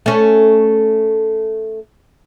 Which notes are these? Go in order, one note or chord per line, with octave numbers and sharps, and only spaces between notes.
A3 C#4